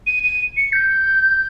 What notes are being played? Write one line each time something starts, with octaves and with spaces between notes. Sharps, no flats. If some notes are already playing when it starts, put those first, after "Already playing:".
D#7
D#7
C#7
G6